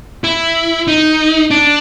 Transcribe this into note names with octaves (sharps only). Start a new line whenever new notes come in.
E4
D#4
D4